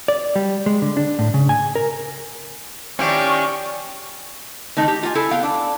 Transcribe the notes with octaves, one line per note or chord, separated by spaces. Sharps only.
D5
G3
G#3
D3
D4
A2
C#3
G#5
A#4
D#3 F3 C#4 E4 G4 D5 C#6
D#3 A3 D#4
G4
F4 G#5
E4 A4 G#5
B3 F5 G5
D4